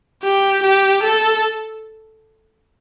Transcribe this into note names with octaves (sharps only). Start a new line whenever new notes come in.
G4
G4
A4